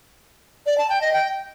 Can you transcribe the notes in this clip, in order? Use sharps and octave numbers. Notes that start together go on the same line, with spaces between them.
D5
A5
G5
D#5
G5